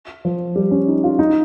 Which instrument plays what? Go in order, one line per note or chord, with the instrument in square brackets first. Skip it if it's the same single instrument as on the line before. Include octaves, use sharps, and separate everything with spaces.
[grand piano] F3
G3
C#4
D#4
F4
D#4